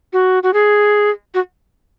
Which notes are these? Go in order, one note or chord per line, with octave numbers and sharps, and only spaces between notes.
F#4
F#4
G#4
F#4